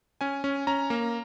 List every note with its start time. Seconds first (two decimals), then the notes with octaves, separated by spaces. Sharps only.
0.21 C#4 G#5
0.44 C#4
0.67 C#4 A#5
0.90 A#3